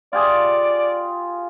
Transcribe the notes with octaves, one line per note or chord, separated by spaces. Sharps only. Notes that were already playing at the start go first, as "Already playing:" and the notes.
F4 G4 G#4 D5